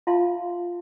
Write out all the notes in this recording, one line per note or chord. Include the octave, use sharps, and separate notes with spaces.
F4 E5 F5 A5 C6